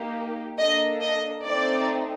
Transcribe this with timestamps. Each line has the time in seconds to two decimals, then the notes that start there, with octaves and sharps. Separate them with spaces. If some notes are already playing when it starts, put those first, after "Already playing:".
Already playing: A#3 D#4 G4
0.58 A#3 D4 A4 D#5
1.01 D#5
1.45 A3 C4 D#4 D5